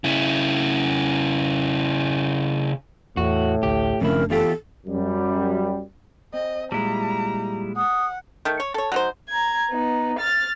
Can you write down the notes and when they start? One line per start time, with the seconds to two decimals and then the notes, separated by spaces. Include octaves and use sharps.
0.04 C#3 E4
3.17 E2 A2 F#4
3.63 A1 D2 G4
4.01 F#1 F2 C#3 A3 D4 E4 A#4
4.30 E2 F4 G4 A4
4.86 F#2 G3
6.34 C4 D#5
6.72 A#2 G3 G#3 E4 A#5
7.77 F#5 D#6
8.45 D#3 A3
8.60 C#5
8.74 A4 C#5
8.92 F#3 D#4 C5
9.29 A#5 G#6
9.70 B3 D#4
10.19 F6 A6